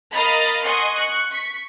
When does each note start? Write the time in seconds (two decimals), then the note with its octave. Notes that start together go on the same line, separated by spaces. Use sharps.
0.13 A#4 D#5 F5 A#5 B5 A6
0.63 D#5 F#5 G#5 C6 C#6
0.97 C#6 F#6
1.31 C#6 B6